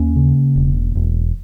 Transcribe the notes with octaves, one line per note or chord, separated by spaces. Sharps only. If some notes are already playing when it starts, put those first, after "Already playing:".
Already playing: D#2 A#3 C#4
C#3
E1
E1